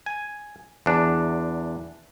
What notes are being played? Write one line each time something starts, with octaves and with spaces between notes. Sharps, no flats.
G#5
E2 D4